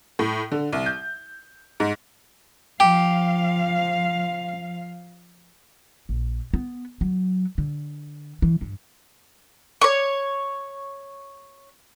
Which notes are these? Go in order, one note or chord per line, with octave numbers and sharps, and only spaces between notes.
A2
D3
C2
G6
G#2
F3 G4 F5
A#1
B3
F#3
D3
E3
G2
C#5 C#6